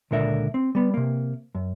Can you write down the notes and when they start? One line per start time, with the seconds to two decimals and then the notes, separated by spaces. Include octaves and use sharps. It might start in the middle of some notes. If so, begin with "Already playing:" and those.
0.11 C#2 A#2 D3 A#4 E5
0.54 C4
0.75 G3 B3
0.94 C3 A#3
1.55 F#2